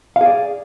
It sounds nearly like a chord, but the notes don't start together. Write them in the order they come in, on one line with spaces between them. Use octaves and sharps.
F5 G#4 D5